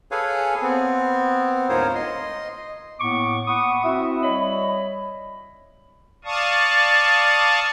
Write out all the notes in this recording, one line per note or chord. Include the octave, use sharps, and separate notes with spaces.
G#4 A4 B4 C#5 F5 G#5
B3 C4
D2 G#2 F4 A#4 C5 C#5
D#5 C6
A2 A#3 B3 C#6 D6
F#5 B5 C#6 D#6
C4 E4 F#4 E5
G3 C#5 D#5 B5
D5 F5 A5 C#6 D#6